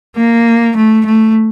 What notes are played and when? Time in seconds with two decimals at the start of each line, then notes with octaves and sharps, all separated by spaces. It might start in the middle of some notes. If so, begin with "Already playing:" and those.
0.17 A#3
0.76 A3
1.06 A3